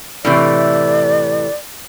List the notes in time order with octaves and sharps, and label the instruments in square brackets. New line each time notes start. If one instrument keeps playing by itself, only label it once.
[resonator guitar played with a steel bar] A2 C3 E3 [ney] D5